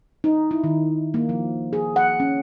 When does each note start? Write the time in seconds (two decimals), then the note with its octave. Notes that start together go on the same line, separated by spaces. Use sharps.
0.24 D#4
0.51 E4
0.64 D#3
1.14 A#3
1.29 F3
1.73 G#4
1.96 F#5
2.20 C#4